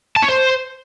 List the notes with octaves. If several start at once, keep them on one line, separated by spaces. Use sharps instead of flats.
A5
C#5
C5